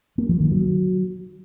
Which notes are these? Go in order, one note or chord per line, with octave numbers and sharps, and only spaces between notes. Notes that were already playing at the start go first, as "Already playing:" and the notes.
A#3
F3
D#3
F#3